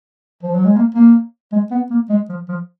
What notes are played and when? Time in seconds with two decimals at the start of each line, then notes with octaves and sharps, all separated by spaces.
0.43 F3
0.55 F#3
0.65 G#3
0.76 A#3
0.95 A#3
1.53 G#3
1.71 B3
1.90 A#3
2.10 G#3
2.29 F3
2.49 F3